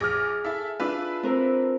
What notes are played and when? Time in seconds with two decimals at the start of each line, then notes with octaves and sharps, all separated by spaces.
0.01 A#1 G#4 D6 F6
0.44 E4 A4 E5
0.80 D4 E4 F4 B4
1.23 C4 A#4